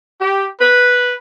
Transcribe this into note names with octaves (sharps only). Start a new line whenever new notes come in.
G4
B4